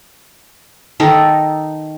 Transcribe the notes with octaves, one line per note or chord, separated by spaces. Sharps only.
D#3 D#4 A4 A#5